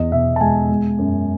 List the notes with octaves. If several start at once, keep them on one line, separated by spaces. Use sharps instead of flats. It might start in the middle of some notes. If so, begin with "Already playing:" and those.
Already playing: E2 D#5
B2 E5
A5
G#3 G#5
G#3
F#2